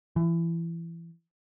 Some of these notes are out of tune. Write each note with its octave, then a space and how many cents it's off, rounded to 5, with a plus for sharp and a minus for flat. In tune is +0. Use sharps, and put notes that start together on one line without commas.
E3 +25